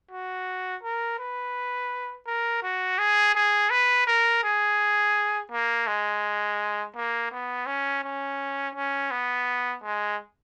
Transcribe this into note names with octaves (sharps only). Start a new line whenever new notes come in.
F#4
A#4
B4
A#4
F#4
G#4
G#4
B4
A#4
G#4
A#3
G#3
A#3
B3
C#4
C#4
C#4
B3
G#3